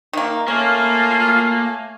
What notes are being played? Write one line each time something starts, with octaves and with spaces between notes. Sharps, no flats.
D#3 A#3
A3 A#3 C#4 F4 G#5